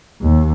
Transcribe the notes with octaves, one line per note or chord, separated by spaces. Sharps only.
D#2